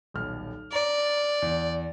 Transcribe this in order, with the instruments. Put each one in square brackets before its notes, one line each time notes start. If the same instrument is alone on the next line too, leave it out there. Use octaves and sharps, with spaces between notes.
[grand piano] D#1 B1 F6
[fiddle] D5 [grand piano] A#5
[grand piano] E2